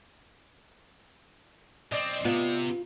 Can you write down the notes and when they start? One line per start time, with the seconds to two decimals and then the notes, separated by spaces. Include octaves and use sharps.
1.92 B1 C4 D5 D#5
2.25 C3 B3 F4